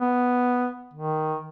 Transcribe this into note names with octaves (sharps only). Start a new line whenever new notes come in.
B3
D#3